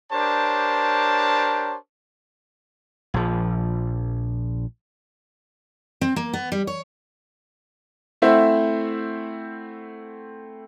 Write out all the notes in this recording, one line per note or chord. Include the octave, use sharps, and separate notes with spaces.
D4 G4 A#4 C5 C#5 A5
A#1 F3
C4
A#3
B3
G3
C#5
A3 C4 E4 C5 E5 F#5